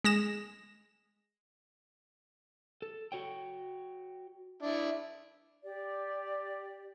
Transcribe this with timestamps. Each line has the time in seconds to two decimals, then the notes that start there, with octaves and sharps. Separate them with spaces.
0.04 G#3 A#6 E7
2.82 A4
3.12 F#4 C#5 G5
4.62 D4 E4
5.63 G4 D5